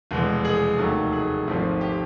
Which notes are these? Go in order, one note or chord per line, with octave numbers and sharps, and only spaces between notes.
F1 E2 B2 G#3 B3
G#4
F1 D#2 D#3 F#3 A3
G#4
G#1 G#2 F3 A3 C4
G4